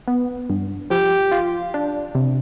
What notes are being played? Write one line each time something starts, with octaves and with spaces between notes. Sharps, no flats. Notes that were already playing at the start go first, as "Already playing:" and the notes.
B3
G2
F3 G4
F4
D4
C3